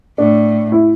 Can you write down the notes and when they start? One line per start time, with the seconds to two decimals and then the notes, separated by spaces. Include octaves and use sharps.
0.18 A2 D4
0.72 E4